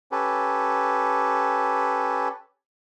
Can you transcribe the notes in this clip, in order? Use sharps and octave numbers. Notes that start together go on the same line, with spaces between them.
C#4 G4 A4 B4